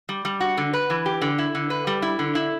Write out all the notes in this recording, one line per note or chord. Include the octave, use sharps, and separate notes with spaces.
G3
G3
F#4
D3
B4
E3
G4
D3
E4
D3
B4
G3
E4
D3
E4